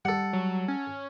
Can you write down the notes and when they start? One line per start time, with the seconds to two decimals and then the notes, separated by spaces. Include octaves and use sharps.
0.05 G3 A4 F#5
0.33 F#3
0.68 C#4